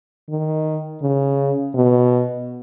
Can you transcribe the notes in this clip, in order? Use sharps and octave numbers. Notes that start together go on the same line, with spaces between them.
D#3
C#3
B2